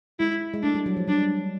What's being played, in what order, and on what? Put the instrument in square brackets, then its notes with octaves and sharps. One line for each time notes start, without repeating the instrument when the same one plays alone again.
[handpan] G#3 [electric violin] E4
[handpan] G#3
[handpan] A3 [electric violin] D4
[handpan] G3
F#3
F3
[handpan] G3 [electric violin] D4